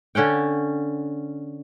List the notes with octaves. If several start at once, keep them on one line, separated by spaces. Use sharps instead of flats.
D3 C#4 F#5 G5